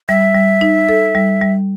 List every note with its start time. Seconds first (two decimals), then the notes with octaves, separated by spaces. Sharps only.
0.09 G3 E5
0.35 G3
0.61 D#4
0.89 A4
1.15 G3
1.42 G3